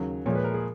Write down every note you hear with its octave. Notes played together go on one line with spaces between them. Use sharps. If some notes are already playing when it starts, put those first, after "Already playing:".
Already playing: D#2 C#3 F#3
A#2 F3 G#3 C#5
B4
A#4
G#4